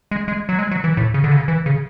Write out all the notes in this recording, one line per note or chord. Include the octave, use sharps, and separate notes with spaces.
G#3
G#3
F#3
G#3
F#3
E3
A2
C#3
D3
C#3
E3
C#3